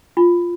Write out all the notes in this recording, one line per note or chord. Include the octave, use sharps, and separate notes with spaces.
F4